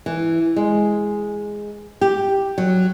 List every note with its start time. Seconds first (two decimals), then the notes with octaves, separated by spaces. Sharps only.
0.06 E3
0.56 G#3
2.01 G4
2.58 F#3